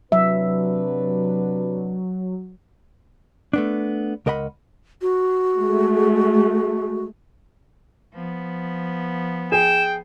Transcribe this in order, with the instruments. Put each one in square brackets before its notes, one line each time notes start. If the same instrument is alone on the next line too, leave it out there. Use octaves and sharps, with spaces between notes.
[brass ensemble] C3 D4 B4 [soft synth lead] F#3 [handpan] E5
[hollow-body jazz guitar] A3 B3 D4
C#2 A#4 D#5 F#5 B5
[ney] F#4
[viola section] G#3 A3
[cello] F3 B3
[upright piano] G#4 [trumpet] G5 [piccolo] E7